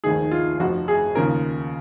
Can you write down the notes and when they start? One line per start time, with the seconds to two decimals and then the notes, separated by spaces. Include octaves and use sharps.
0.04 F1 D#2 D#3 G#4
0.31 F4
0.59 F1 F2 F3 F#4
0.88 G#4
1.15 D#2 C#3 F3 A#3 A#4